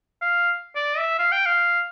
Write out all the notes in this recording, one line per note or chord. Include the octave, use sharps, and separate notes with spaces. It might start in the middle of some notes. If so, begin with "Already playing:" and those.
F5
D5
E5
F5
G5
F5